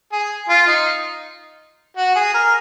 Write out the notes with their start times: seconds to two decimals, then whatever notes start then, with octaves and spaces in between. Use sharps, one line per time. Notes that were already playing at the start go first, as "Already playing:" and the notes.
0.12 G#4
0.49 F4
0.67 D#4
1.97 F#4
2.16 G#4
2.34 A#4